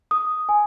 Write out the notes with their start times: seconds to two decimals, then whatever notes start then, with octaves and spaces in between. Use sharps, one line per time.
0.11 D#6
0.49 G#5